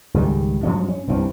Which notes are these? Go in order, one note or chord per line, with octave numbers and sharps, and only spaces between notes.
C#2 G#2 D#3 G3
G2 F3 F#3 C#4
C#4
C2 G2 E3 C4